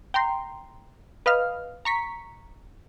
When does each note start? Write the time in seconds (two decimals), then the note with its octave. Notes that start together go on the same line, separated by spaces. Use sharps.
0.14 G5 A#5 C6
1.26 B4 D#5 F5 F6
1.85 A#5 C#6 B6